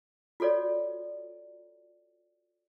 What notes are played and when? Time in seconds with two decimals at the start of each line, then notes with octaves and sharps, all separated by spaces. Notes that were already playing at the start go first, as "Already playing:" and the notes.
0.40 F4 F#4 A4 C#5 D5